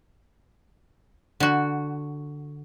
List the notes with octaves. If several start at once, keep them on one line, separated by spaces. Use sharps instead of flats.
D3 F#4